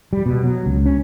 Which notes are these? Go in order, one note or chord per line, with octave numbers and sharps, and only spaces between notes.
G3
B2
F#3
C#2
C#4